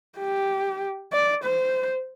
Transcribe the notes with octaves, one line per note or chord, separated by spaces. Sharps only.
G4
D5
C5